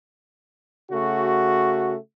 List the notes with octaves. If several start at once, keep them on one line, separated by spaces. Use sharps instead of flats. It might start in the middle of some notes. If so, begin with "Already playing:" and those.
C#3 A3 F#4